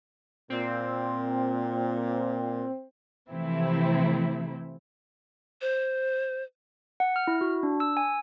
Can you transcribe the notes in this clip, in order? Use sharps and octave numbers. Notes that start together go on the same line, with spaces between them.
A#2 C4
C3 E3 F3 A3 C4 E4
C5
F#5
F6
E4
F#4
D4
E6
G#5